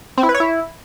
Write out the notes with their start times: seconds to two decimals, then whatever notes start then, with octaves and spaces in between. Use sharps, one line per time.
0.18 C4
0.23 E4
0.29 B4
0.34 C#5
0.40 E4